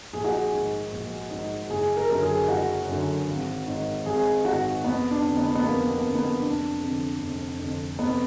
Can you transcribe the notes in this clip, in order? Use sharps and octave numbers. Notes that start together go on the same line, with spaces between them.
A#1 G#4
F#4
G#4
G#2 D#3
A#1
G#2 D#3
F#1 G#4
A#4
F#2 D3 A#4
G#4
F#1 F#4
F#2 D3
G#1
G#2 D#3
G#1 G#4
G#2 D#3 F#4
F1 B3
D4
F2 D3
B3
B3
F1 A#3
B3
F2 D3
B3
F1 D4
F2 D3
F1
F2 D3
F1 B3